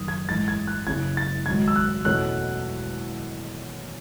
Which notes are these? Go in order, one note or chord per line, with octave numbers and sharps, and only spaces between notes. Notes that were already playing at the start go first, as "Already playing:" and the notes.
Already playing: F#1 F#2 D#3 D#6
G#6
A1 G#2 E3 A6
G#6
F#6
F#1 F#2 C#3 E3 G#6
A6
G#1 G#2 F#3 G#6
E6
F#6
E2 B2 A3 C#4 F#6